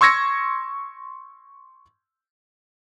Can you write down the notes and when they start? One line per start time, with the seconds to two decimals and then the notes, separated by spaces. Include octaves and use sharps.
0.01 C6 C#6 E6 G#6 A#6 C#7